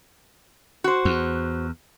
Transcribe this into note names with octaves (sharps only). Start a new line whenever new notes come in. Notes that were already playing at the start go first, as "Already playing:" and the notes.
F#4 C5
E2